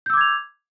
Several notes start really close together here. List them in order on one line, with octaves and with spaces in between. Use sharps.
G6 E6 D6 G#6 F7